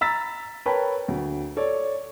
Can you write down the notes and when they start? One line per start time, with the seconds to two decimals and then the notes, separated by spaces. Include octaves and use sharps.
0.01 A#5 B5 E6 A6 B6
0.66 A#4 B4 C#5 G5 A5 B5
1.08 D2
1.57 A4 C#5 D5